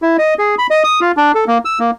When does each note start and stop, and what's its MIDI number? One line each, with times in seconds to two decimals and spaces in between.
0.02 0.17 64
0.19 0.34 75
0.38 0.55 68
0.59 0.67 83
0.70 0.83 75
0.84 1.00 87
1.01 1.12 65
1.17 1.32 62
1.35 1.45 69
1.47 1.58 58
1.65 1.79 88
1.80 1.91 58